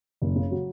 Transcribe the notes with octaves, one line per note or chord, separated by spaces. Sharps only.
F#1
C#3
F#3